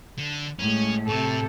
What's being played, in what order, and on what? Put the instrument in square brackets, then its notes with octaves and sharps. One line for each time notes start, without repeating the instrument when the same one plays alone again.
[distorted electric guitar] D3
[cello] A2 G#3 [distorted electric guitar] C#4
[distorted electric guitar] A2 [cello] C3 A4